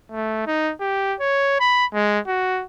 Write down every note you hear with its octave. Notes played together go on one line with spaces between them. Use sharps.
A3
D#4
G4
C#5
B5
G#3
F#4